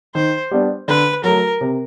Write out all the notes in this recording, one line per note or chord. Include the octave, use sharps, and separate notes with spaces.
D#3 C5
G3 B3 D4
D3 B4
F#3 A3 A#4
C3